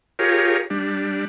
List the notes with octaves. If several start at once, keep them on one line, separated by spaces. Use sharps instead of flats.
F4 G4 G#4 A#4 C#5
G3 D4